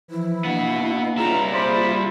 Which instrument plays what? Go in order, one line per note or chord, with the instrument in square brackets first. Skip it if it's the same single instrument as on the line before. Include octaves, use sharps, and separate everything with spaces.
[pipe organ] E3 F3 [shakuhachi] E4
[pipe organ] A#3 D4 [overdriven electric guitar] B3 F#4
[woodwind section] C#2 A#5 [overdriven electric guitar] G3 E4 [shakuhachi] F4
[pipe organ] A#3 G#4 [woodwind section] C5 D5 B5